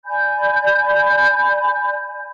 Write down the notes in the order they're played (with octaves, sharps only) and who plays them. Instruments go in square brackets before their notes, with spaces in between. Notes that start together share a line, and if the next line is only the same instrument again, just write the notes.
[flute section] D5 G#5 B5 G6